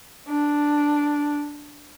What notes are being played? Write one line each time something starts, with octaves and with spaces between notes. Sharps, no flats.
D4